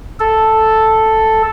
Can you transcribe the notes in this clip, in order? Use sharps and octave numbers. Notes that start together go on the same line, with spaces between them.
A4